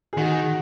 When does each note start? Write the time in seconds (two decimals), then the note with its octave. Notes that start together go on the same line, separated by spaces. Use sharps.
0.13 G#4
0.18 D#3 F#4